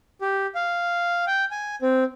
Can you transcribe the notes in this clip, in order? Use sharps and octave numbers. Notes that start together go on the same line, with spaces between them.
G4
F5
G5
G#5
C4